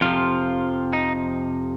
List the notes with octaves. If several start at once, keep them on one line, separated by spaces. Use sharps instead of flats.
F2 C3 F3 F4
D#4